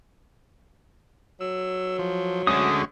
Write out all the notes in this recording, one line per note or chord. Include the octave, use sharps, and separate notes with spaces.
F#3 E6
F3
D2 D3 G#3 C#4 F#4 D#6